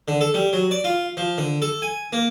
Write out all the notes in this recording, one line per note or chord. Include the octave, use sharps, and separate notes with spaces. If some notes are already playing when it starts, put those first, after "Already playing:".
D3
A4
G3
F#3
D5
F4
F3
D3
A4
G#5
A#3